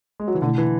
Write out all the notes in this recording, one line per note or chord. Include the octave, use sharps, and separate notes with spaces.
G#3
F#3
E3
B2 D3 A3 E4
E3